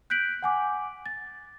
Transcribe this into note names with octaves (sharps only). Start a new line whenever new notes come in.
F#6 G6 B6 D7 F#7
F#5 G#5 D6
A6